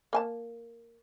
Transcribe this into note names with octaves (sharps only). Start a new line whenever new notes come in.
A#3 G#5 A5